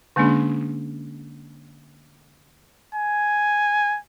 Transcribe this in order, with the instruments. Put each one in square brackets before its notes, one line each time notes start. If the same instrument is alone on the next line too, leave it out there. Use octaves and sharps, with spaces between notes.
[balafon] D3 G#3 A#3 C#4 D4 G#4
[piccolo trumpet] G#5